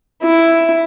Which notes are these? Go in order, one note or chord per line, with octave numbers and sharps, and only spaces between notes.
E4